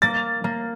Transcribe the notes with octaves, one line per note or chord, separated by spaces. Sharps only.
A#3 A6
A#3